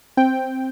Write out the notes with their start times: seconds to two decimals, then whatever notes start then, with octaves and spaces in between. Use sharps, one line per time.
0.17 C4 G5